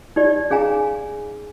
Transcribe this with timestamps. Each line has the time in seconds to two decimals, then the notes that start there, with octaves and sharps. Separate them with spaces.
0.16 D#4 G4 D5
0.50 C#4 G#4 F5 G#5 A#5